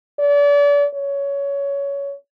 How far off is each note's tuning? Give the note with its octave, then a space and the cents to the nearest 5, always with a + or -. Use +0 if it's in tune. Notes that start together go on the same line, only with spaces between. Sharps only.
D5 -35
C#5 +15